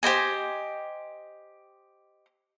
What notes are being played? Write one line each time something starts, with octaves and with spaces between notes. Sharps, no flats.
G4 C5 D#5 G#5